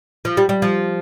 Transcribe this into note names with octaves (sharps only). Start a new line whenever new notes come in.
F3
G3
G3
F3